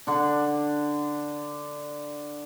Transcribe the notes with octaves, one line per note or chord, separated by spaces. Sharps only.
D3 D4